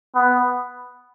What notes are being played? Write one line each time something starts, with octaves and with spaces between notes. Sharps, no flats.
B3